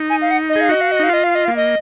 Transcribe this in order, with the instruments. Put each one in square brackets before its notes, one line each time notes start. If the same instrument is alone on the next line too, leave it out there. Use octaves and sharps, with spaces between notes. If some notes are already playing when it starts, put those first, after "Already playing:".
Already playing: [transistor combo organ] D#4
[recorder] G#5
F5
F#5
D#5
[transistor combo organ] G#4
[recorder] F5
[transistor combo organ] F#4 [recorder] D#5
[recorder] F5
D#5
[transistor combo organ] D#4 [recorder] F5
[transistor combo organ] F4 [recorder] D#5
[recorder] F5
D#5
[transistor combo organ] A#3 [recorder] F5
[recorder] D#5